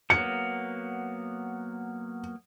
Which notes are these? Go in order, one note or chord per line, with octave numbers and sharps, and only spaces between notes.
F#3 A#3 B3 C#7